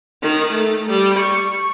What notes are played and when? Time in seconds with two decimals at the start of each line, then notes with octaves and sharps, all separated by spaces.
0.22 D#3
0.51 A3
0.89 G3
1.18 C#6